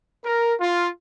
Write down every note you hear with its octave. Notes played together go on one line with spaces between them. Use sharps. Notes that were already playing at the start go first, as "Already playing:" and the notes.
A#4
F4